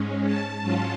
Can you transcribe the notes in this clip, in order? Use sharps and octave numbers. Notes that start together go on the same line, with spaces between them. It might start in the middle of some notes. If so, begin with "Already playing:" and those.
Already playing: G#2 G#3 C#4
A5
G#2 F#3 C#4 F4